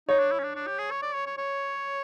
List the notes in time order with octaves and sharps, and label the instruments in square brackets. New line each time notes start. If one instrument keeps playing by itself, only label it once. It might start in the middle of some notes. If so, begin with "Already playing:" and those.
[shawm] D#4 [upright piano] C#5
[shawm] D4
E4
C#4
D4
D4
G4
G#4
C#5
D5
C#5
C#5
C#5